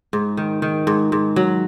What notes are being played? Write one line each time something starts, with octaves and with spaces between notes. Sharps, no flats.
G#2
D#3
D#3
G#2
G#2
F#3